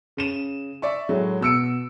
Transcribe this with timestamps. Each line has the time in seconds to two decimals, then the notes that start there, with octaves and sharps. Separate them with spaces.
0.17 C#3 D#7 E7
0.82 D5 E5 C#6
1.09 A2 F#3 G#3
1.41 B2 E6 C#7 D7